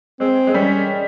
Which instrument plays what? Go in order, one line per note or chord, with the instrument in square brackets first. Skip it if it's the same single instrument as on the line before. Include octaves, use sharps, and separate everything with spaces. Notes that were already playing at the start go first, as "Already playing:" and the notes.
[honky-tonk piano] G#3 [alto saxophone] C4
[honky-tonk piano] G#3
[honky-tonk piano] G3 [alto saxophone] C#4